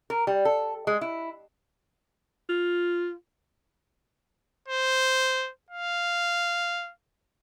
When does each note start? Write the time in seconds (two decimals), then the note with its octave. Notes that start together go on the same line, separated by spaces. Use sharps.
0.10 A#4
0.27 G3
0.45 A4
0.87 G#3
1.01 E4
2.49 F4
4.68 C5
5.70 F5